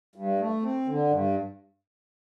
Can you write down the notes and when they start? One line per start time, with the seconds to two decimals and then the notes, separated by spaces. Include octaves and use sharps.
0.16 G2
0.39 A3
0.63 C4
0.87 D3
1.11 G2